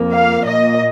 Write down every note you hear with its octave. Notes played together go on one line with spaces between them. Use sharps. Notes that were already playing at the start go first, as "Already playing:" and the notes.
Already playing: F2 F3 A#3
F5
A#2 A#3 D#5